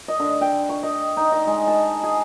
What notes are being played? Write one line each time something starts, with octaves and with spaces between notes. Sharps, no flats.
D#5
D3
G5
C#6
D#5
D#4
D#5
G#3
A5
G#4